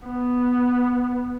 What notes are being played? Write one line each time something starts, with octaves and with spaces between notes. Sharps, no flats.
B3